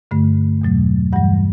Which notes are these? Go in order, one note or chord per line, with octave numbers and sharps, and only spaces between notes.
G2 D3 A3
E2 B2 F#3 A3
G2 E3 G3 F#5